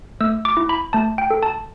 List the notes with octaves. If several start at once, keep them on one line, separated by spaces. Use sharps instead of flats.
A3 E6
D6
E4
B5
A3 A5
G5
A4
A5